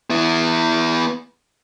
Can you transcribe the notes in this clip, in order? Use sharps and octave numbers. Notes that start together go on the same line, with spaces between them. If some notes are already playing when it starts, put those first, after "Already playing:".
B3 E4